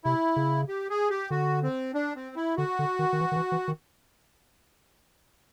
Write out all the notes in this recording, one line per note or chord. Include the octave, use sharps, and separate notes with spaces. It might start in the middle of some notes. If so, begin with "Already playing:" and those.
C3 E4
C#3
G4
G#4
G4
D3 F#4
C4
D4
C4
E4
D3 F#4
D3
D#3
D#3
E3
D#3
E3
E3
D#3